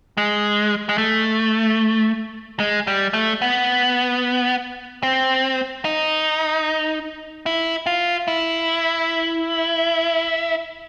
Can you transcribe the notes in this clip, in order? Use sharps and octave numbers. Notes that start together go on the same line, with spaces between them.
G#3
G#3
A3
G#3
G3
A3
B3
C4
D#4
E4
F4
E4